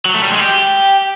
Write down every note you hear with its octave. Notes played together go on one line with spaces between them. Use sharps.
F#3
A3
G3
G#3
G4